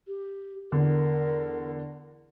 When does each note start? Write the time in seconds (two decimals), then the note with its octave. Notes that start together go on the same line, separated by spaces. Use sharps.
0.08 G4
0.72 E2 D3 A#4